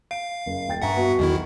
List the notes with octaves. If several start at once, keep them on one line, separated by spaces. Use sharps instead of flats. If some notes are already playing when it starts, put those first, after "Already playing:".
F5 D7
F#1
D#1 G5 A6
G2 E5 F#5 G#5 A#5 C#6
B3 F#4
B1 E2 D#3 E4